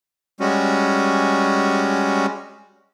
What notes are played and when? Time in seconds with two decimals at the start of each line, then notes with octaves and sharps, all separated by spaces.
0.40 G3 G#3 C#4 F#4